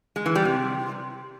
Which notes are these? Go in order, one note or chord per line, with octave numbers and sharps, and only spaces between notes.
G#3
E3
G3
C3